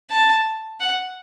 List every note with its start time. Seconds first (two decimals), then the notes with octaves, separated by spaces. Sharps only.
0.10 A5
0.80 F#5